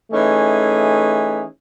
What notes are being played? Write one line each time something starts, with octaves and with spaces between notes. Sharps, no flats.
E3 A3 C#4 D#4 G#4